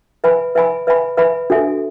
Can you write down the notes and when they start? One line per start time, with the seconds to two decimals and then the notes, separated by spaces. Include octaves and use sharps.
0.24 B4 E5 G#5 B5
0.55 B4 E5 G#5 B5
0.87 B4 E5 G#5 B5
1.17 B4 E5 G#5 B5
1.50 D4 F#4 A4 E5 G#5